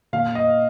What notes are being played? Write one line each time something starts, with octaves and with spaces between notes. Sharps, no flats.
A#2 F5
D#5